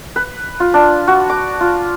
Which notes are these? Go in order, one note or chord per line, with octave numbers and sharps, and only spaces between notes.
B4
F4
D4
F#4
D6
F4